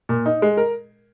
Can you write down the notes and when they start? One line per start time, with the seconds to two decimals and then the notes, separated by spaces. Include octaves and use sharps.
0.09 A#2
0.26 D#4
0.42 G#3
0.57 A#4